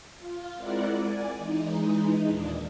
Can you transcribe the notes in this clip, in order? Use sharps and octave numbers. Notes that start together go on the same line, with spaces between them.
F4
G#3 C4 E4 A#4 D5 F#5
D5 G#5
E3 G#3 D#4
D#2 A#2 D4